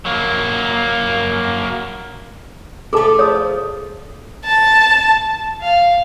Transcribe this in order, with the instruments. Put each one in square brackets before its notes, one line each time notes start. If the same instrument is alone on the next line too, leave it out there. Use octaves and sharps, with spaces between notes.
[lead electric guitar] F#3 A#3
[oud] A3 E4 [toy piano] G#4 A4 A5
[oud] F3 [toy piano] C#5 D#6
[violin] A5
[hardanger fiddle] F5